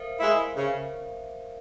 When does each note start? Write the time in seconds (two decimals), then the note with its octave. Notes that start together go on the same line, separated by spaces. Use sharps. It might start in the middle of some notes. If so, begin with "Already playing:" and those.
Already playing: A#4 C5 E5 F5
0.19 G#3 E4
0.56 C#3